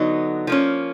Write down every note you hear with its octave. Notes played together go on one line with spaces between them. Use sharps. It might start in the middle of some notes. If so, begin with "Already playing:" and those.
Already playing: D3 F#3 B3 D#4
F3 A#3 C#4